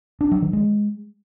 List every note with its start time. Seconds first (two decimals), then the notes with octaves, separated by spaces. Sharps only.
0.21 D4
0.31 F#3
0.42 D#3
0.53 G#3